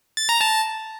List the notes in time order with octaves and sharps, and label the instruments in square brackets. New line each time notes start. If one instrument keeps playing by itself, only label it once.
[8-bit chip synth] A6
A#5
A5